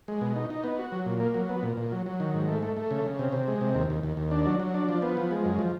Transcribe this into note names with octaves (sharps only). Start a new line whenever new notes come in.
G#3
B2
D#4
D#4
B3
F#4
F#3
A#2
A#3
F#3
B3
A#2
A#2
F#3
F#3
D#3
G#2
A3
A3
A3
C#3
C#3
C3
C3
G#3
C3
D#2
D#2
D#2
D#2
D4
F#3
F#3
D4
F3
B3
F3
G#3
F#2
F3